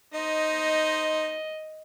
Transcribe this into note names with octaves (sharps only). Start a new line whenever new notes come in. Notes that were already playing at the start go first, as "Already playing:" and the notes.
D#4 C5 D#5